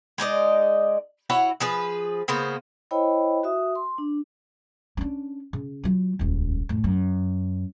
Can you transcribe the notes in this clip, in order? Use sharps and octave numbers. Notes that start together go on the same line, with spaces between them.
G#3 D#4 D5 D#5
E4 F#4 C#5 F#5
F3 G#4 B4
C#3 A#3 B3 C5
E4 C5 C#5 D#5 G5 B5
F#4 E5 D#6
C6
D4
C#4 D4
C#3
F#3 F4
D#1 C#2
F2 A2
F#2